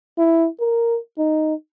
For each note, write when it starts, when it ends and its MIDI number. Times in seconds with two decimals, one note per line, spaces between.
0.18 0.48 64
0.60 0.98 70
1.18 1.54 63